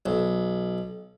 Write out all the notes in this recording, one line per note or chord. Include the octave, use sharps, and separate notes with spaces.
B1